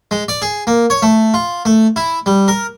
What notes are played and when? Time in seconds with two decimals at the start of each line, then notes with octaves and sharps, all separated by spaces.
0.11 G#3
0.28 D5
0.42 G#4
0.67 A#3
0.90 C#5
1.02 A3
1.34 F4
1.65 A3
1.96 E4
2.26 G3
2.48 A#4